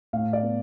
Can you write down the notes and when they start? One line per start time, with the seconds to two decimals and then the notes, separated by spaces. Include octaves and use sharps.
0.13 A2 F5
0.33 D5
0.43 B3